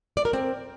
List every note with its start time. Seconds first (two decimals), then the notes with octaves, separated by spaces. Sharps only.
0.17 D5
0.25 A#4
0.33 C4